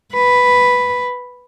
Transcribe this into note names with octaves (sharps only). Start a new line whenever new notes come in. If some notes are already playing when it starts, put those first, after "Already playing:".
B4